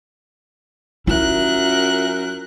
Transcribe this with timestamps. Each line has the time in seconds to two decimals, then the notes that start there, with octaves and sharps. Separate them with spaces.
1.07 F#2 E4 F4 A#4 E5 F#6